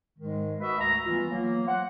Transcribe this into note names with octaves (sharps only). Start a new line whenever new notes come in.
G#2 D#3 G#3
F#4 B4 D#5 E5
D2 A#5
E3 G3 G#3 B3 F4
F#3 A#3
C5 F#5